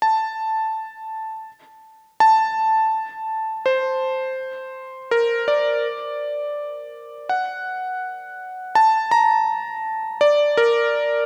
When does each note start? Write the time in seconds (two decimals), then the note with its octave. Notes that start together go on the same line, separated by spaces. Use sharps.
0.02 A5
2.20 A5
3.66 C5
5.11 A#4
5.48 D5
7.29 F#5
8.75 A5
9.11 A#5
10.21 D5
10.57 A#4